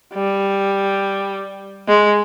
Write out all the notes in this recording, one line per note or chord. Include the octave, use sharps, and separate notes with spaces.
G3
G#3